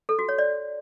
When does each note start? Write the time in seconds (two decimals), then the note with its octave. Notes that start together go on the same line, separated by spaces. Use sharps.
0.09 A4
0.19 F#4
0.29 C#5
0.38 D5